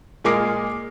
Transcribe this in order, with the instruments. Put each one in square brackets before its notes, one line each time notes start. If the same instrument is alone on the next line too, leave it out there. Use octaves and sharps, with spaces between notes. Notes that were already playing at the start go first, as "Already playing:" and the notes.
[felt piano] A#2 G#3 A#4 D6 C7